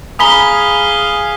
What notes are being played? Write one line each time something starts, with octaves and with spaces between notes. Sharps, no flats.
G#4 F5 G#5 A#5 B5 D#6 B6 G7